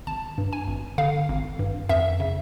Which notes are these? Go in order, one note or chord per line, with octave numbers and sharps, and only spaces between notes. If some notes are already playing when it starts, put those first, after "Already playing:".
G#1 A5
G2
G#5
G#1
D3 F5
G#1
G2
F2 E5
C#3